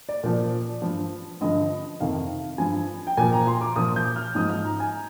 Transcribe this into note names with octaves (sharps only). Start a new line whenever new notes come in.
D5
A#2 F3
G2 F3
G2 D3 F3 D#5
F2 C3 D#3 F5
G2 F3 G#5
G5
A#2 F3 G#5
A#5
C6
D6
A#2 F3 D#6
G6
F6
G#2 F3 D#6
F6
A#5
G#5